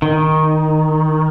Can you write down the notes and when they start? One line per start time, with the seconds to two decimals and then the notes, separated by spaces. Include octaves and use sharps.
0.02 D#3